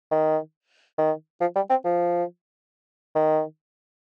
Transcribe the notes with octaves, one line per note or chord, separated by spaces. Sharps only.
D#3
D#3
F3
G3
C4
F3
D#3